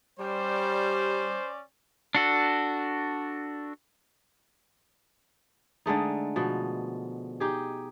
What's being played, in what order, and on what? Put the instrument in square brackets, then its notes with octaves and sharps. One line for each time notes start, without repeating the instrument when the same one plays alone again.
[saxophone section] G3 [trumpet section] C#4 D5 [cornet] C5
[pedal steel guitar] D4 F#4 A4
[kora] D3 G#3 A3 D#4
B2 F3
D#4 G4 G#4